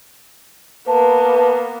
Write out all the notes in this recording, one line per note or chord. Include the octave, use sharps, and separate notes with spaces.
A#3 B3 B4 A5